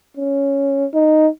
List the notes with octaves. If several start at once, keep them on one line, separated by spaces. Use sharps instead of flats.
C#4
D#4